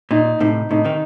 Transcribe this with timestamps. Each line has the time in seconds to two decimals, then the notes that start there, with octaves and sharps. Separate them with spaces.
0.11 A#2 D#4
0.40 A2 C3 D#4
0.71 A2 C3 D#4
0.85 C3 D#3